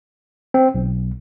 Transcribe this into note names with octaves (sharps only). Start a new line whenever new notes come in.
C4
B1